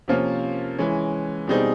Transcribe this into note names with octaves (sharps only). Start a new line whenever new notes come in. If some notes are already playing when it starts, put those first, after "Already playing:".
C3 F3 A#3 C#4 F4
E3 G#3 C#4
B2 G3 C4 D#4 G#4